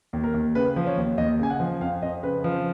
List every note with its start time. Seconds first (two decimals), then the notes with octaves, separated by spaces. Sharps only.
0.13 D#2
0.24 A#4
0.34 D#2
0.55 C#3 B4
0.76 F3
0.87 C#5
0.97 D#2
1.17 D#2 D#5
1.39 C#3 G#5
1.50 F#5
1.60 F3
1.81 F2 F5
2.02 F2 D#5
2.23 C#3 B4
2.44 F3